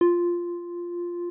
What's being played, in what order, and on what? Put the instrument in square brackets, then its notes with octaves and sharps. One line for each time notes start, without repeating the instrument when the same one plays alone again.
[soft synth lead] F4